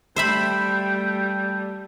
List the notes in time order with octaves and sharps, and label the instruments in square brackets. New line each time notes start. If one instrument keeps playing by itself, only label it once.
[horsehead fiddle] G3 A3 [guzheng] C5 E5 B5 [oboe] G5